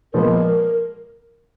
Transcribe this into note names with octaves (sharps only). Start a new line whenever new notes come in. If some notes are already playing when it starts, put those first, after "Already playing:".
A#2 F3 G#3 B3 A#4